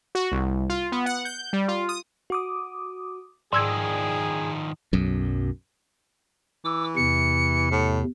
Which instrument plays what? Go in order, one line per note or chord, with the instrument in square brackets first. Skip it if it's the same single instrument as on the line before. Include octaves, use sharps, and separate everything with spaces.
[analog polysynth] F#4
C2
F4
B3
F#5
G6
G3
F4
D#6
[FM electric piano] F#4 D6 D#6
[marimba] G#2 E6 G#6 [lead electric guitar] D#3 F3 [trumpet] G#4 [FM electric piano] D5
[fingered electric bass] B1 F#2
[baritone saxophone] E3 [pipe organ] D6 E6
[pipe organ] E2 C3 [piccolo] C#7
[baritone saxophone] A2